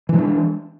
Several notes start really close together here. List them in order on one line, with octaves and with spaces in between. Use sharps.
E3 G#3 D4